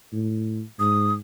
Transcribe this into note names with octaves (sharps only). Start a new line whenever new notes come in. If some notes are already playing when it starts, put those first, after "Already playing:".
A2
G#2 D#6